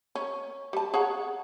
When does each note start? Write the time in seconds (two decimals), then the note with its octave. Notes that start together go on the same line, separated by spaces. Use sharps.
0.15 C#4
0.73 G3 A5
0.94 G#4 C#5 F#5